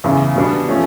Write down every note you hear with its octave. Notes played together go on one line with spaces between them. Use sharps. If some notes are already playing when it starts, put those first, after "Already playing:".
E2 C#3 E3
B2 G3 B3 D4
F3 A3 C#4